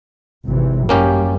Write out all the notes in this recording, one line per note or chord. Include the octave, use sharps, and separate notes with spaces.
G#1 C3 E3
F#2 G3 A#3 C#4 G4